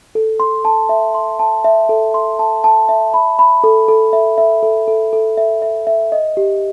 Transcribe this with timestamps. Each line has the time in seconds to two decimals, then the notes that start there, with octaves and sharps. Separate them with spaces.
0.15 A4
0.40 C6
0.65 A5
0.89 E5
1.15 C6
1.39 A5
1.64 E5
1.89 A4
2.14 C6
2.39 A5
2.64 A5
2.89 E5
3.14 B5
3.39 B5
3.64 A4
3.88 A4
4.13 E5
4.38 E5
4.63 A4
4.88 A4
5.13 A4
5.37 E5
5.62 E5
5.87 E5
6.12 D#5
6.37 G4